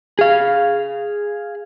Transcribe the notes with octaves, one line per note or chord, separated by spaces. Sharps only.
G#4 F5